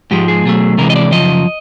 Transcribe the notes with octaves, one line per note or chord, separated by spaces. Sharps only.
G#2 F3 G#3 G4
G#4
B2 F#3 A3
C3 E3 G#3 A#4
D#5
D5
F#2 C#3 F3 D#5